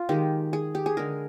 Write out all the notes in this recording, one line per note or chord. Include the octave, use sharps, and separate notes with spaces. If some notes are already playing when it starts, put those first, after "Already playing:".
Already playing: F4
D#3 G#3 G4
G#4
G4
G#4
D3 G#3 A#4